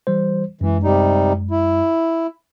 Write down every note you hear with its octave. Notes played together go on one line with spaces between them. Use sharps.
E3 G3 C5
F#2 E3 G#3
C3 G3 D#4
E4